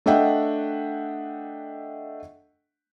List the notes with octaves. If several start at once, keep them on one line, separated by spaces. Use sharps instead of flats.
A3 D4 D#5 E5 F#5 G5